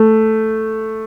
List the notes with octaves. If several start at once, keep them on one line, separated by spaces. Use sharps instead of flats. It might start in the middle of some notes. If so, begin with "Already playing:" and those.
Already playing: A3